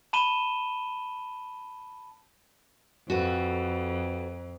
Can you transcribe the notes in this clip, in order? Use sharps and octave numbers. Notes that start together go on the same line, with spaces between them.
A5 B5 D#7 E7 G7
F2 F#4 A4 B4